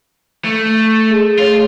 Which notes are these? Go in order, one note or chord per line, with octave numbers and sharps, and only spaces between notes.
A3
G#4
A3 F4 C#5